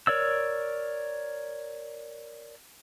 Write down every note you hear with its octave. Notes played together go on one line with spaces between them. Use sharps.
A#4 C#5 D5 E6